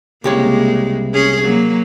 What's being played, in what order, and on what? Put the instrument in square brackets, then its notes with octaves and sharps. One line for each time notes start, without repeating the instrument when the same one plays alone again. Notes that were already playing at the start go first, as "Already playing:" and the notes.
[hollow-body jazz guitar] C2 G4 C#5 [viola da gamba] C#3 G#3 A#3
[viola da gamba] C#4 G#4
F#3 A#3